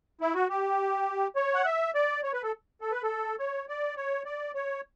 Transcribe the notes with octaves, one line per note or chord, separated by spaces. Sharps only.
E4
F#4
G4
C#5
F#5
E5
D5
C#5
B4
A4
A4
B4
A4
C#5
D5
C#5
D5
C#5